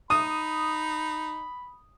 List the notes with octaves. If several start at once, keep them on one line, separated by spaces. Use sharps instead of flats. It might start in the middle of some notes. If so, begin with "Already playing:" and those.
D#4 B5 D#6